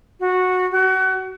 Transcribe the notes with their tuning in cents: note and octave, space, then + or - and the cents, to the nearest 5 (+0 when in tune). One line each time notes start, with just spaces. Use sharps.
F#4 -10
F#4 +30